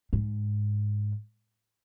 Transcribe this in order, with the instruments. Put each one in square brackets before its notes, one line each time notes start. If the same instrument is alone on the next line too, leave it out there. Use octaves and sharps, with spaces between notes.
[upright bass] G#2